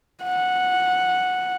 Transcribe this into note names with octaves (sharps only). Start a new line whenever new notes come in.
F#5